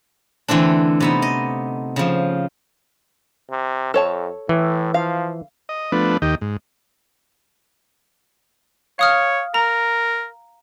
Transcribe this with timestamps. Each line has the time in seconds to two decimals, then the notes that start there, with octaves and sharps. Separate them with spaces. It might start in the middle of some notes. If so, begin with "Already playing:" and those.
0.48 D3 E3 A3 C4 D4
1.00 C3 B3 D#4
1.22 D#5
1.96 C#3 F3
3.51 C3
3.94 F2 A4 C#5 A5
4.49 A2 E3
4.94 F3 F5
5.69 D#5
5.92 F3 A3 B3 D4 B4
6.22 D#2 D#3 G4 D#5
6.41 G#2
8.99 C#5 F5 D#6 F6
9.54 A#4 A#5